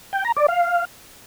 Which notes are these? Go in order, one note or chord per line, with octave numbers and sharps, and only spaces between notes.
G5
A#5
D5
F5